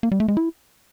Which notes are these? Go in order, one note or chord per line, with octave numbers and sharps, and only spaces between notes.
A#3
G3
A3
G#3
E4